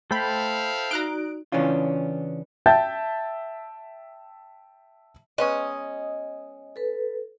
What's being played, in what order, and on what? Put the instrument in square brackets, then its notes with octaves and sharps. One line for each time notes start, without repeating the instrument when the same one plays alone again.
[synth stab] A3 B5 [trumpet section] E4 F5 [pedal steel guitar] A4 C5 G5
[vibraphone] D#4 F#4 D5 [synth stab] A#5 F#6 D7
[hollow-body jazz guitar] C#3 E3 C#4 D4 F4
[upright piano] E5 G5 A5 G6 A6
[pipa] G#3 B3 C#4 [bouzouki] D#5
[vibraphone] A4 B4